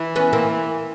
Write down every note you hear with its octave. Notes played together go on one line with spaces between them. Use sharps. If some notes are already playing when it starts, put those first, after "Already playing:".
Already playing: E3
B3 C#4
A#3 C4